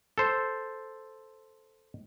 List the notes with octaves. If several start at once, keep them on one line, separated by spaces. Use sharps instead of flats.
A4 C5